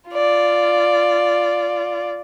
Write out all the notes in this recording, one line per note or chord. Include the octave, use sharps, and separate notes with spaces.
F4 D5